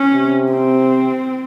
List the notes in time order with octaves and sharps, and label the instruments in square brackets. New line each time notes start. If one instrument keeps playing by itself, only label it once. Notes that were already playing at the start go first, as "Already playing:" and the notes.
Already playing: [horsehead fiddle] C#4
[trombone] C3
[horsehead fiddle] C4